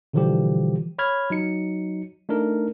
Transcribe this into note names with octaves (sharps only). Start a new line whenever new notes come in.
B2 D3 E3 F3 G3 G4
C#5 B5 F6 G#6
F#3 D#4 C#7
A3 D4 D#4 A#4